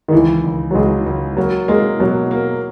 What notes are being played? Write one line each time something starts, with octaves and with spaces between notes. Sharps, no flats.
D#3
C#2 E3
C#2
F#3
C#2 G#3
C#2
F#3 A#3
G#3 A#3
B2 F#3
A#3